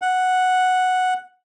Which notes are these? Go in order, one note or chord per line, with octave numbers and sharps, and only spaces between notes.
F#5